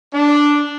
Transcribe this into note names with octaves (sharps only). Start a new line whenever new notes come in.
D4